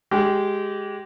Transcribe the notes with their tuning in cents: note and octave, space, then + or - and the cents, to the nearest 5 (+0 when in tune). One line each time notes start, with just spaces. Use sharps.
G#3 +0 G4 -20